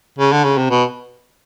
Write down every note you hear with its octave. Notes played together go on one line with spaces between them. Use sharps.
C#3
D3
C#3
C3
B2